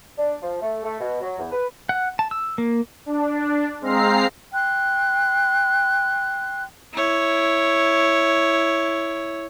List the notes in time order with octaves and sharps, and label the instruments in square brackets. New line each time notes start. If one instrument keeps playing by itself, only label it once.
[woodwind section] D4
F3
A3
A3
B2
F#3
E2
B4
[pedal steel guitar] F#5
A5
E6
A#3
[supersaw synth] D4
G#3 C4 F5 A#5 C7
[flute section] G5 C6 F#6
[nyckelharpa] E4 C#5